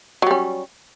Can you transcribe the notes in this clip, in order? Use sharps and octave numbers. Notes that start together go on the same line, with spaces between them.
F#3 G3 C#4